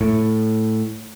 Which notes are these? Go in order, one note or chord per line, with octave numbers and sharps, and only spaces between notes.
A2